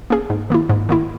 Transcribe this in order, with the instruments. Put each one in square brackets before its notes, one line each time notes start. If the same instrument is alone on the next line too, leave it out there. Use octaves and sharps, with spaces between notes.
[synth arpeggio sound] A#3 C#4 G#4
G#2
D#3 A#3 E4
G#2
D#3 A#3 E4